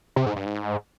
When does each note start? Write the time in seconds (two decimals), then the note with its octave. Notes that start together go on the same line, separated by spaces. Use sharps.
0.16 C3
0.26 G#2
0.36 G2
0.46 G#2